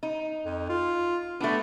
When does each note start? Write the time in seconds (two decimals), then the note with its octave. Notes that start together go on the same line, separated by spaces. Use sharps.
0.03 D#4
0.45 F2
0.69 F4
1.40 A3 B3 D4